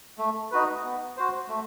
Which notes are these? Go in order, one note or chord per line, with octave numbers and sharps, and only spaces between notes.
A3
D#4 F#4 B4
B3
F#4 C5
A3